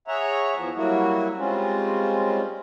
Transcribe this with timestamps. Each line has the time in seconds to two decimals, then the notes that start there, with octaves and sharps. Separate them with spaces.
0.08 G#4 C#5 E5 F#5 A#5
0.53 E2 F3
0.75 F#3 G3 A#3 E4 F#4
1.38 G3 G#3 C4 C#4 F4